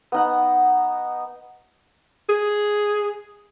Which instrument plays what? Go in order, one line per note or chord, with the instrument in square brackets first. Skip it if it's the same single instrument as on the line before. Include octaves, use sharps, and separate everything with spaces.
[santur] B3 D#4 F#5
[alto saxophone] G#4